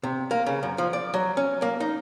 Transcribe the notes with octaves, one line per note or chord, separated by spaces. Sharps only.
C3
A#3
C#3
F#2
F3
D5
F#3
C#4
A#3
D#4